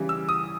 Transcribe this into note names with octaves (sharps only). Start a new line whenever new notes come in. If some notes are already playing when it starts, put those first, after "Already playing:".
Already playing: C#3 E3 G3
E6
D#6